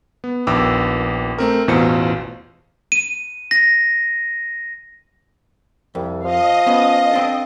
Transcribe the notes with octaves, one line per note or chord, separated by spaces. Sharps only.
B3
A#1 D#2 B3 G5 D6 E6
A3 C4 A#4
A1 E2 B2 F4 C5 C#7
D#7
A#6
C2 F2
F3 D#5 F5
B3 C#4
C4 D4 A4